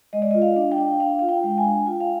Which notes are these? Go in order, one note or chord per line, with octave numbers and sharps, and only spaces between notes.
G#3 D#5
D5
F4 D#5
F5
D4
G5
D4
D4 F5
F4 F5
G5
G#3
G#5
D4
F4 G5
F5